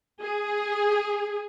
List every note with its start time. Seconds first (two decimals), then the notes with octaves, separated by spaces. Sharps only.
0.21 G#4